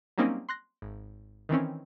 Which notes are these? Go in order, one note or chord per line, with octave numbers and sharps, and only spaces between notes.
F#3 G3 A#3 C4 C#4 D#4
C6 F#6 A#6
G#1
D#3 E3 C4 C#4